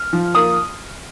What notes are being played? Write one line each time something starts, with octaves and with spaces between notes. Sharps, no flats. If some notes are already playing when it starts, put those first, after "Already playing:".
Already playing: F6
F3
A#3 D#6